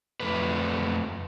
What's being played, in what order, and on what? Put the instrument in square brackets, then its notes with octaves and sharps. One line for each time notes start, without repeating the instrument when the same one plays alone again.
[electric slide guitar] F2 A3 B4